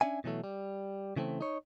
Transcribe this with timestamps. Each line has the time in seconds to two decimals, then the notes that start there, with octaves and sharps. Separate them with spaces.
0.01 C#4 D4 E5 G#5
0.24 B2 E3 F#3 A3
0.44 G3
1.16 C#3 E3 A3 C4
1.41 D#4 C#5